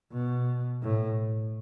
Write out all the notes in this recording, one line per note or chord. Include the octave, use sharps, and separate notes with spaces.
B2
A2